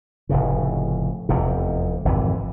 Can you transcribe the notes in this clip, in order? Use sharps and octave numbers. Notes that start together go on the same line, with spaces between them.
F1 A2 C#3
F1 E2 C3
G#1 F2 C3 E3